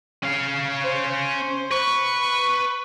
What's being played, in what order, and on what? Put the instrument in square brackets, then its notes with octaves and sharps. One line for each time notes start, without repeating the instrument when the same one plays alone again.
[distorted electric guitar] C#4 F5
[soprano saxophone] C5
[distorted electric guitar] B4 [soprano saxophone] C#6